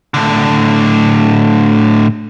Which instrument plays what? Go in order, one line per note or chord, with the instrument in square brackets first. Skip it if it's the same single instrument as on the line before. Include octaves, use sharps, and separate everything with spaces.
[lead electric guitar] A2 D3